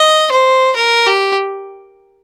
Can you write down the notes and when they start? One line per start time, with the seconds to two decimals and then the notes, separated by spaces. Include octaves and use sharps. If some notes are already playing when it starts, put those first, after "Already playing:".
Already playing: D#5
0.31 C5
0.77 A#4
1.07 G4